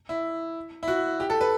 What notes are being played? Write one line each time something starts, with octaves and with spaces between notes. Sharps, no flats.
E4
E4
F#4
G4
A4
B4